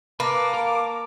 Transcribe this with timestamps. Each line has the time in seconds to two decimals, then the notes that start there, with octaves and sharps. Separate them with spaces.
0.20 A#3 B4 A5 C#6 D6
0.54 A#4